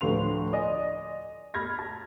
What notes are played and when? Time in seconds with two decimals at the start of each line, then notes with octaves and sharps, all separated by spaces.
0.01 D2 A2 F3 B4 C6 F7
0.53 D5 D#5 G#5
1.54 B5 F6 G#6 A#6
1.79 A5